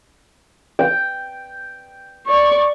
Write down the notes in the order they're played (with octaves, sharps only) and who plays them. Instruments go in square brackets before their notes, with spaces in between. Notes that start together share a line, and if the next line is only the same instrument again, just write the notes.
[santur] G5
[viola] D5 C#6